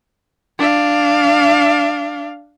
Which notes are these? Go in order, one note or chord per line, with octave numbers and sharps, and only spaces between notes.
D4 F5